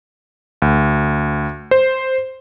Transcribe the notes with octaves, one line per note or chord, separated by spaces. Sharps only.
D2
C5